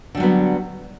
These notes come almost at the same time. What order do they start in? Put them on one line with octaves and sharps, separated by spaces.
D3 G3 F#3 B3